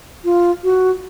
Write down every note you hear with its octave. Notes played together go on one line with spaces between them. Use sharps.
F4
F#4